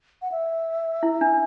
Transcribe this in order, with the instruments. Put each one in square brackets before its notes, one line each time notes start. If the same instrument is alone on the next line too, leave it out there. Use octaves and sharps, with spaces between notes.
[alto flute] F#5
E5
[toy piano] E4
D4